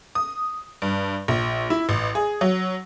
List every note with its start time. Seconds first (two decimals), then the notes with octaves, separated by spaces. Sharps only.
0.15 D#6
0.82 G2
1.28 A#1
1.70 E4
1.89 A1
2.15 G#4
2.41 F#3